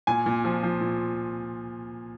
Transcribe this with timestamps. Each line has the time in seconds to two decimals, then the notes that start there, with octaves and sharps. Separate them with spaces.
0.07 A#2 G#5
0.26 A#2
0.44 F3
0.63 F3
0.81 A#2